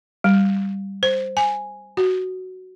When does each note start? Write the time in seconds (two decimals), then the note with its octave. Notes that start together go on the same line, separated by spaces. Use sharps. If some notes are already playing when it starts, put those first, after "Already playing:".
0.24 G3
1.03 C5
1.37 G#5
1.97 F#4